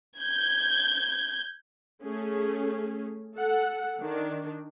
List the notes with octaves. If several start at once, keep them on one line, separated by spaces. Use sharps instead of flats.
G6 G#6
A3 C#4 G#4
A4 F#5
D#3 D4